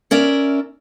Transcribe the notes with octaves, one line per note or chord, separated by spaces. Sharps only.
C#4 A#4 D5 E5